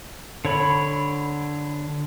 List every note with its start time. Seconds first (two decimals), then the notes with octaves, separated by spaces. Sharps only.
0.45 D3 C#5 B5